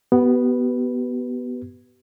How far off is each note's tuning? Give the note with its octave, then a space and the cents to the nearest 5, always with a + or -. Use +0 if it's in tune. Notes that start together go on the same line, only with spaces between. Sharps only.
B3 +0 G4 -40 B4 +0